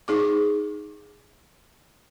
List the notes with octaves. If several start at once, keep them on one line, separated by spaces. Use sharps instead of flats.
D#4 G#4 D6